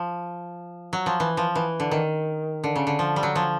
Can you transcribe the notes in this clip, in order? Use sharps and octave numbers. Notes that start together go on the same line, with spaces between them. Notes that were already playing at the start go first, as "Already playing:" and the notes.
Already playing: F3
F#3
F3
E3
F3
E3
D3
D#3
D3
C#3
D3
F3
G3
F#3
F3